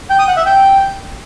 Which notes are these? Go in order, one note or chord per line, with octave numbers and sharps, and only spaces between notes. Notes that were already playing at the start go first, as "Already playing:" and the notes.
G5
D#6
F#5
E5
G5